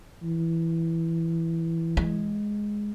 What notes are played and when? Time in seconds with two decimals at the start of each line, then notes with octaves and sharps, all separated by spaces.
0.23 E3
1.97 G#3